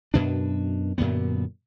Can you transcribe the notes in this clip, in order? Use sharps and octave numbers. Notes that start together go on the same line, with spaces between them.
F#2 B2 D4
F#2 A#2 D3 B3